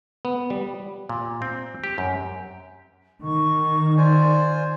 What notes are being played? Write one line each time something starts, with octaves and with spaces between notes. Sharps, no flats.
B3
G3
A#2
C4
G4
F#2
D#3 C#6
F4 C5 D5 G#5